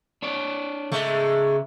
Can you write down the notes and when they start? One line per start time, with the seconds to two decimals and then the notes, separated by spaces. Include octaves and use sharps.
0.22 D4 C#5 D5
0.92 C#3 G#3 A3 E5